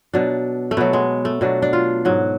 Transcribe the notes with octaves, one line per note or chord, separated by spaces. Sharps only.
B2 F#3 D4
A3
B2 F#3 B3
G#3
A3
B2 F#3 D4
D4
F4
G#2 F#3